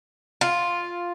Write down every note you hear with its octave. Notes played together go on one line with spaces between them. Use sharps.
F4